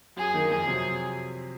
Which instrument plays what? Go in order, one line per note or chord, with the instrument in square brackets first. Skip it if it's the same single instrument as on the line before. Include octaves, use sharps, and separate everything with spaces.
[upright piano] F#2 [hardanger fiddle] G#4
[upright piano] D#3 A#3 D#4
[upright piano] F2 [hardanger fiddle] G#4
[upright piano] C3 F#3 C4